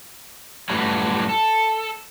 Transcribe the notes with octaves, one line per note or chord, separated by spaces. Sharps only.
F#2 A2 E3 F#3 G3
A4